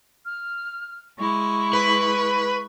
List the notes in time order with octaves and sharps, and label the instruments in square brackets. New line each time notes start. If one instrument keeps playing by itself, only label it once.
[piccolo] F6
[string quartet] G#3 E4 [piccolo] C#6
[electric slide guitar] B4